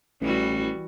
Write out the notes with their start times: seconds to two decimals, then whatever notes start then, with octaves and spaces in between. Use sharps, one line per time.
0.21 A1 E3 G3 F#4